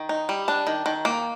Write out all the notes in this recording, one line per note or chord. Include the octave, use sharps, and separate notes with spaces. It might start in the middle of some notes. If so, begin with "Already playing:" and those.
Already playing: D#3
D#4
G3
D4 A5
D#3
D#3
A#3